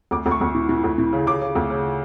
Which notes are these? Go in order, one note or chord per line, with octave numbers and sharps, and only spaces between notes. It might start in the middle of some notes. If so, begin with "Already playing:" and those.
D2 D6
D2
C#6
D2
E3
E3
D2
E3
C#3
C#3 D6
C#3
D2
C#3